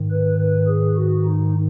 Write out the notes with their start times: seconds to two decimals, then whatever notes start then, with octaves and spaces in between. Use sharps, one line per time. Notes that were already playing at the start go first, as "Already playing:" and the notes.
Already playing: G#2 D#3
0.10 B4
0.39 B4
0.67 G#4
0.96 F#4
1.25 D#4